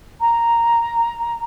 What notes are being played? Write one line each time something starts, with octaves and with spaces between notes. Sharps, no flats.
A#5